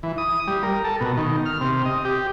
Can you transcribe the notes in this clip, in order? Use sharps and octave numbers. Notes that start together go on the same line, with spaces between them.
E3
D#6
G3
A#4
A4
B2
D#3
F6
C3
D#5
G4